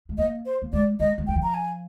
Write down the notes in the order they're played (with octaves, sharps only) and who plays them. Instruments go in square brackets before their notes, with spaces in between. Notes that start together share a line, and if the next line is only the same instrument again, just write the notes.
[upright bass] G#3
[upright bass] A#3 [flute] D#5
[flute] C5
[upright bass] A#3
[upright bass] G#3 [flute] D5
[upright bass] G#3 [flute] D#5
[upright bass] G#3
[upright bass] G3 [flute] G5
[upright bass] F3
[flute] A#5
G#5